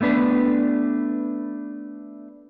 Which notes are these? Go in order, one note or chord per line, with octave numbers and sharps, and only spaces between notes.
A3 B3 D4 B4